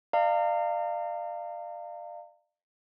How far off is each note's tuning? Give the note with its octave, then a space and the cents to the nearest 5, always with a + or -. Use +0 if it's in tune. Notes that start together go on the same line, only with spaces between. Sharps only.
D5 +40 F5 -15 A#5 -40